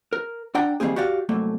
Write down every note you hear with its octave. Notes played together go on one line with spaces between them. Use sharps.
A#4
D4 F#5 G5 A#5
D#3 G3 A#3 C4 G#4
F#4 G4 D5 F5
C2 F#2 A3 A#3